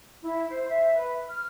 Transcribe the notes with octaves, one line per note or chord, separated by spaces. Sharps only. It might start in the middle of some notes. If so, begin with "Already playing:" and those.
E4
C5
E5
B4
F6